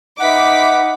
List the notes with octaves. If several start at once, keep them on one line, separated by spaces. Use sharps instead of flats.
D#4 B4 E5 F#5 D6 B6